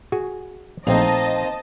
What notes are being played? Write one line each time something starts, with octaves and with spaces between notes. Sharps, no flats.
F#4 G#4 G#5
A#1 A3 A#3 C4 D#4 D#5 A5